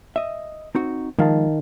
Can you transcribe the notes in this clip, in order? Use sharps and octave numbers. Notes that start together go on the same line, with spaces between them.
D#5 E5
C4 D#4 F#4
D#3 F3 G#3 F5 A5